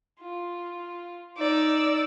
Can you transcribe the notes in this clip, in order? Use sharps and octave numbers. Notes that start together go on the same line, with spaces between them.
F4
D#4 D5 E6